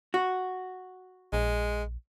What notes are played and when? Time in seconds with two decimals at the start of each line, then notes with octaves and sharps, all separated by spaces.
0.14 F#4
1.33 A#1 G#3